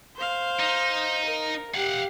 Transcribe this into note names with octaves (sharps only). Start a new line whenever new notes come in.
C5 F5
D#4
A#4
G4 F5 F#5